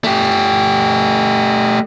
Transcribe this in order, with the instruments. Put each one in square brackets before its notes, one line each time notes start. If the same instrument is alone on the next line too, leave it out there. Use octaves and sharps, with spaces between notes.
[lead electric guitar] A3 G4